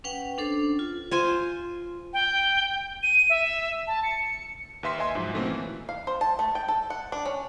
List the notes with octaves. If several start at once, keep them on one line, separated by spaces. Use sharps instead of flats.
C#4 B4 F#5 G5
C#4 D4 A4 C5
F4
F4 C5 G#5
G5
D#7
E5
A5
C#7
D#2 B4 E5 C6 B6
D#5 E5 G#5 C6
G#2 F3 F#3
B2 D#3 A3 A#3 C4 C#4
E3
F5
C5
A5
A3
G5
A4
F#5
D4
C#4